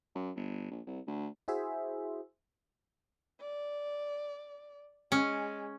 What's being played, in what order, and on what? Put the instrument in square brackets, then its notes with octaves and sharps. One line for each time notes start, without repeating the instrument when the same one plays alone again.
[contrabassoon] F#2
G1
A#1
C2
D2
[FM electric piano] E4 F#4 G#4 C5 E5
[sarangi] D5
[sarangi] G#3 [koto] C#4